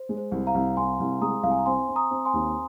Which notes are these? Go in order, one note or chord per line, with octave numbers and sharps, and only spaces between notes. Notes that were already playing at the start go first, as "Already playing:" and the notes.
Already playing: C5
G#3
C5
C2
F5 A#5
C2
C2 G#5 C6
C2
G#3 A#5 D#6
C2 F5
G#5
A#5
C4 G#5 C6
C4
A#5 D#6
C4
G#5 C6
D#2